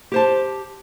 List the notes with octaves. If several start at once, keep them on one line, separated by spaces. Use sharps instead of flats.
G4 C5 A5